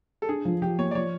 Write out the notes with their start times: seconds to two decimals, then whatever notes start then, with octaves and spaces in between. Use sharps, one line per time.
0.22 A4
0.28 D4 G#4
0.45 F3
0.62 F3 G4
0.78 A#3 C#5
0.91 D5
0.95 F3 C#5